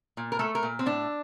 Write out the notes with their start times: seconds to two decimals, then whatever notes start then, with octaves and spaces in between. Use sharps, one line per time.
0.17 A#2
0.32 A#4
0.39 A3 A4
0.55 A#4
0.63 A#2
0.79 C4
0.86 A2 D4